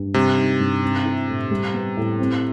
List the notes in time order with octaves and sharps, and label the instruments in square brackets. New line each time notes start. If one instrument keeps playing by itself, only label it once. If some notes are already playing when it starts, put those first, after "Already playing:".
Already playing: [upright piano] G2
[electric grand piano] C3 [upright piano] G3
[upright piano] D#4
G2
C4
E4
A2
G3
B3
A2
C4